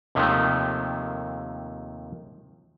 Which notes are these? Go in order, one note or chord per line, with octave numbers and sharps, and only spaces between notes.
D#2 C3 D#3 F3 G#3 A3